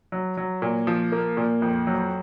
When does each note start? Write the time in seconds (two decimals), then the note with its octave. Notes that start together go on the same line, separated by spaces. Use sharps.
0.12 F#3
0.37 F#3
0.62 A#2
0.87 F3
1.12 A#3
1.37 A#2
1.62 F2
1.87 F#3